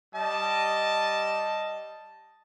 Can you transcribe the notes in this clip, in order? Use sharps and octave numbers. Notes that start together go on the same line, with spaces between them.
G3 D#5 A5